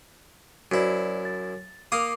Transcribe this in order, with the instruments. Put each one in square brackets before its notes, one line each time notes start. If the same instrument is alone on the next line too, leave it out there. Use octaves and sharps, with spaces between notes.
[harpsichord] F#2 E4 [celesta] F#4 C5 D5
[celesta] A6
[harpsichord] A#3 F5 D#6 [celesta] D6